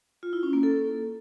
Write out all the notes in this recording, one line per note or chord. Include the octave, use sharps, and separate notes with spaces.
F4
E4
C#4
A#3
A4